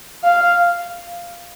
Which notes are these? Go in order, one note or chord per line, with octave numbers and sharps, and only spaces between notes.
F5